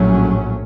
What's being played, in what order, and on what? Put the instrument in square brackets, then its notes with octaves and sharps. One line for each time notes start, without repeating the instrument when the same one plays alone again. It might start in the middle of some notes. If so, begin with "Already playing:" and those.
Already playing: [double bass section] A#1 A2 F#3 A3 C#4